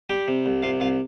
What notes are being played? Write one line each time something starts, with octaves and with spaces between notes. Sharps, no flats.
G3 G4 G5
C3
C2
C3 F4 F5
C2 F4 F5